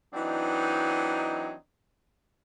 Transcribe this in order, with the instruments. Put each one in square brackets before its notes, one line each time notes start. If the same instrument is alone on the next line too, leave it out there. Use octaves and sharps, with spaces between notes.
[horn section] E3 F#3 C4 D4 D#4